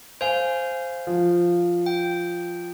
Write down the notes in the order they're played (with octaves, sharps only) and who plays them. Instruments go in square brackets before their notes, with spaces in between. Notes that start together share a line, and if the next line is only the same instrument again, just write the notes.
[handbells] C5 F5 [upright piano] G#5
[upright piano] F3
[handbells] G5